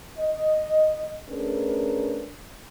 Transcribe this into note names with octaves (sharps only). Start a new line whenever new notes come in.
D#5
A3 C#4 D4 G#4 A#4 B4